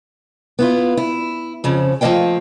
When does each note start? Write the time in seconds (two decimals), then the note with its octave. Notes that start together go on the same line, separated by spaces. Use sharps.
0.59 B3 E4 F4
0.97 E4
1.64 F2 C#3 F3
2.01 F3 A3 A#3 D#5 F5 G5